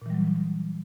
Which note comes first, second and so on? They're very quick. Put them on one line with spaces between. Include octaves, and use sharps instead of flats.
A#2 E3 G3 F#3